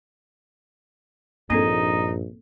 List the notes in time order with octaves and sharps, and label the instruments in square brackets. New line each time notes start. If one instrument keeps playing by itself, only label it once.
[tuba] A#1 [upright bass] G2 [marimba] A#3 C4 A4 [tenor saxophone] D#4